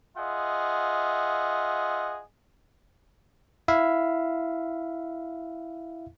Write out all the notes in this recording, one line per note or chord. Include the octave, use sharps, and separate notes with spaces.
F4 G#4 D#5 E5 F#5
E4 E5 F5